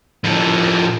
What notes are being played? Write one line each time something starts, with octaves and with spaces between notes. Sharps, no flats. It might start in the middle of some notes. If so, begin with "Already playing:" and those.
A2 F3